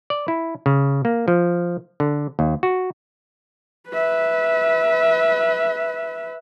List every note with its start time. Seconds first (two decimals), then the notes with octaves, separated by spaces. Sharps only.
0.10 D5
0.28 E4
0.66 C#3
1.05 A#3
1.28 F3
2.00 D3
2.39 D#2
2.63 F#4
3.90 B4 E5